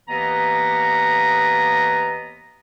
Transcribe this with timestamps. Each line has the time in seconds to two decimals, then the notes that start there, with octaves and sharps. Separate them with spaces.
0.09 D#2 E3 A#3 B3 D#5 A#5